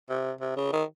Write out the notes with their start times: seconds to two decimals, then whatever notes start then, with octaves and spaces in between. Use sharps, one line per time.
0.09 C3
0.41 C3
0.57 C#3
0.73 D#3